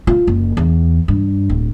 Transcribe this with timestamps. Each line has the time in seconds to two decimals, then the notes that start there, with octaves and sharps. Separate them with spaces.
0.07 F4
0.27 F#1
0.57 E2
1.08 G2
1.50 D1